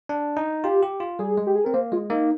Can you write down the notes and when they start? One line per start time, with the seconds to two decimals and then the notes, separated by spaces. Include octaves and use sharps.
0.09 D4
0.37 D#4
0.64 F4 G4
0.83 G4
1.00 F4
1.19 G3 G#4
1.38 G#3
1.47 G4
1.56 G#4
1.65 C4 A#4
1.74 A#3 C5
1.92 G#3 F4
2.10 A#3 D#4